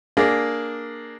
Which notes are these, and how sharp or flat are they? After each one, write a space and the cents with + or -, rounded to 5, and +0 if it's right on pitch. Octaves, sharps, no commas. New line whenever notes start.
A#3 +0 D4 +0 G#4 +5